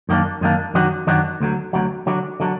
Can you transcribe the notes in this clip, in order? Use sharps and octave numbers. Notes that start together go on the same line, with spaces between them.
F#2 D#3 A#3 D4
F#2 D#3 A#3 D4
F#2 D#3 F#3 D4 F#4
F#2 D#3 F#3 D4 F#4
D2 D3 F#3
D2 D3 F#3
D3 F#3 D4
D3 F#3 D4